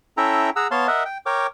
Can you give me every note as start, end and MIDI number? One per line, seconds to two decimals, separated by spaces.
0.17 0.50 61
0.17 0.50 64
0.17 0.50 69
0.17 0.50 76
0.17 0.50 79
0.17 0.50 82
0.56 0.67 68
0.56 0.67 78
0.56 0.67 82
0.56 0.67 88
0.71 0.87 59
0.71 0.87 73
0.71 0.87 77
0.71 0.87 81
0.71 0.87 84
0.88 1.03 70
0.88 1.03 75
0.88 1.03 76
0.88 1.03 78
1.05 1.18 79
1.26 1.47 70
1.26 1.47 73
1.26 1.47 79
1.26 1.47 86